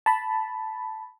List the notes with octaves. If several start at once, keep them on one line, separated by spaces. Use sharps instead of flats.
A5 B5